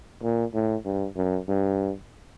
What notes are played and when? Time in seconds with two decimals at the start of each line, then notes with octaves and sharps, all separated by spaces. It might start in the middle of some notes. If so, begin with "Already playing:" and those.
0.23 A#2
0.54 A2
0.85 G2
1.17 F#2
1.48 G2